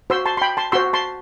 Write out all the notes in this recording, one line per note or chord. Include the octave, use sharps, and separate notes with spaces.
F#4 C5 C6 E6
A5 C6
C6
G5 B5
A5 C6
F#4 C5 C6 E6
A5 C6